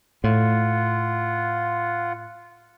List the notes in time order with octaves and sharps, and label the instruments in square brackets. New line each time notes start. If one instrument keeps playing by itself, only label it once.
[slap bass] A2 [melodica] F4 F#5